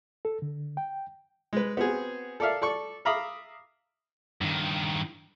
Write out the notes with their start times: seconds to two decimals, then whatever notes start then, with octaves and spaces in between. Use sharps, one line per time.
0.25 A4
0.42 D3
0.77 G5
1.53 G#3 B4
1.77 B3 C4 F#4 G#4
2.40 A4 A#4 D5 E5 F5
2.62 A4 D5 C#6
3.05 E5 F5 A#5 B5 D6 D#6
4.41 G2 D#3